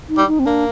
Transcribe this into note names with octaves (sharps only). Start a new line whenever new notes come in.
D#4
G3
D#4
C4
A#3 D4